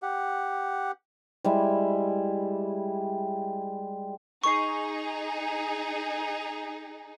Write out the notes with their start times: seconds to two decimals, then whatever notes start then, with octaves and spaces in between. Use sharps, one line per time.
0.02 G4 F#5
1.44 G3 G#3 E4
4.44 D#4 G#4 C#6 C7